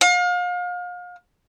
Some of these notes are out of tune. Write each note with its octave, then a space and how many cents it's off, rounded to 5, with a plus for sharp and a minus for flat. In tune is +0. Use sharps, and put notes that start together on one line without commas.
F5 +35